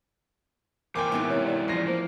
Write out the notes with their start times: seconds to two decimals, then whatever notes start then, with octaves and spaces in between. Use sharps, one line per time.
0.95 E3 A#3 A#4 C5 G5 G#5 D6
1.12 G#2 E3 F#3 B3 D#4
1.30 C3 C#5
1.46 D5
1.68 G#2 F3 G#3 C#4 A#6 C7
1.87 A#3 C5